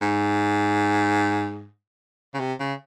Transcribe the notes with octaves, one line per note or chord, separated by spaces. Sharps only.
G#2
C#3
C3
C#3